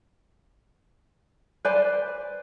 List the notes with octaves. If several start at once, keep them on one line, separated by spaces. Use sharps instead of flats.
B4 C5 D5 G#5